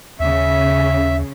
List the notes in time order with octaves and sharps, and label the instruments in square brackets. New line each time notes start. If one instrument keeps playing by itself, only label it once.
[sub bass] D#2 [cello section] C#3 C#4 [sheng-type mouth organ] E5